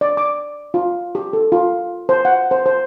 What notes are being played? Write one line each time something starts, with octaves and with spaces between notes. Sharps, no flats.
D5
D6
F4
G4
A4
F4
C5
F#5
C5
C5